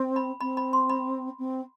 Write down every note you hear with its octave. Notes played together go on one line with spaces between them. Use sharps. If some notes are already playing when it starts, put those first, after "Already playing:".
Already playing: C4
B5
C4 B5
B5
C6
B5
C4